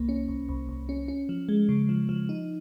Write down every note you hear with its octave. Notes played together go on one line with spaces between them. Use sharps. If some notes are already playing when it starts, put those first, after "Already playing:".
Already playing: C2 A#3
C#4
C2
C2
C2
C#4
C#4
F3
G#3
C#3
F3
F3
D#4